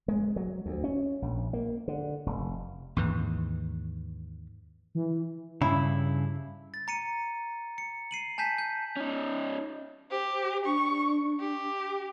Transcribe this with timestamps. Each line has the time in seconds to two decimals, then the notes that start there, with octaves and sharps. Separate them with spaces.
0.08 G#3
0.36 F#3
0.66 D2
0.84 C#4
1.22 A#1
1.53 A#3
1.88 D3
2.26 F1
2.96 D#2 G#2 E3
4.95 E3
5.62 G2 C#3 E4
6.74 A6
6.88 A#5 C#7 D#7
7.78 C#7
8.11 C7 D#7 F#7
8.38 G#5 A5 G6 B6
8.58 G6
8.97 C#4 D#4
10.11 G4 C5
10.65 D4 C#6
11.40 G4